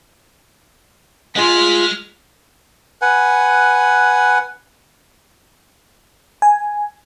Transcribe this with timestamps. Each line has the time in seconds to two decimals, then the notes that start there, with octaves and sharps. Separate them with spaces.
1.36 G#3 F4 G#4 D#5 F6 B6
3.02 B4 F#5 G#5
6.42 G#5